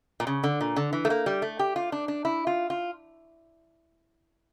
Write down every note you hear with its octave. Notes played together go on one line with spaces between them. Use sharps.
A#2
C#3
D3
A#2
D3
E3
A3
A#3
G3
A3
G4
F4
D4
D4
E4
F4
F4